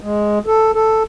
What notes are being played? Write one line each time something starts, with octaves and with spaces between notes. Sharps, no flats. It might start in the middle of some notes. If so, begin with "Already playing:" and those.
G#3
A4
A4